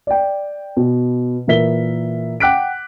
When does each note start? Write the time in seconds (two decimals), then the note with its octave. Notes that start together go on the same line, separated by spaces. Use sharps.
0.07 D5 G5
0.77 B2
1.47 A#2 E3 A#4 E5 B6 G7
2.40 F#5 G5 D6 F#6 B6 D7